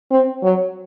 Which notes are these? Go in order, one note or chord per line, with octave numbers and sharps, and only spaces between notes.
C4
F#3